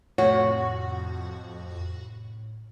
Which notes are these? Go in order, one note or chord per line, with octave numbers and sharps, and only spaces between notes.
F2 A2 C3 F#4 C#5